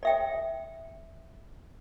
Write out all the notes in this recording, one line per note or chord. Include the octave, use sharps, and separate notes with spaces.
D5 E5 G5